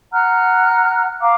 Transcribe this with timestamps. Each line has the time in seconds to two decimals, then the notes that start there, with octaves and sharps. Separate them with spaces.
0.12 F#5 A#5 F6 F#6
1.20 F5 A#5 D6